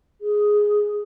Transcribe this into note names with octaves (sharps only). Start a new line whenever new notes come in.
G#4